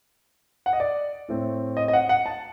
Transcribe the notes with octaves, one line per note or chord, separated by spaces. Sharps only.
F#5
D#5
D5
A2 A3 C4
D#5
D#5
F#5
F#5
A5